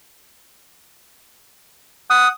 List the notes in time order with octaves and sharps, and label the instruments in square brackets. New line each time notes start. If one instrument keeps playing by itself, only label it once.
[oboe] F#5 [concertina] D#6